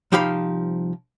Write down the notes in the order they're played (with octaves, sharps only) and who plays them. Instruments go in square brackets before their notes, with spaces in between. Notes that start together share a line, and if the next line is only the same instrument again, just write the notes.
[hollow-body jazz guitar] C2 F3 D#4 G4 F5 B5